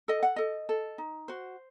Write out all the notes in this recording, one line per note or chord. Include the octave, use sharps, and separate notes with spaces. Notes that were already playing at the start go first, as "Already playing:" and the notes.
A4 D#5
F#5
A4 D#5
A4
D#4
F#4 C5